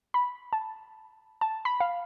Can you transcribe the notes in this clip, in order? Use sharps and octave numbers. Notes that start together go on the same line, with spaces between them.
B5
A5
A5
B5
F5